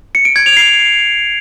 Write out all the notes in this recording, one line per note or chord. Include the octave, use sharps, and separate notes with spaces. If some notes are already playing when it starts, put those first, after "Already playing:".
C#7
D7
G#6
F7
C7